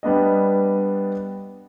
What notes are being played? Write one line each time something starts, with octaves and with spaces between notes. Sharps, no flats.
G3 B3 D4 D#5